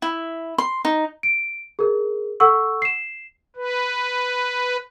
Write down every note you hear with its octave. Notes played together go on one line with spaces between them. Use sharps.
E4
C6
D#4
D7
G#4 A#4
A4 F#5 C#6 E6
C7 E7
B4